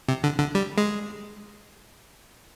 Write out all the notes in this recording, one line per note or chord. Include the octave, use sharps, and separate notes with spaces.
C3
D3
D3
G3
G#3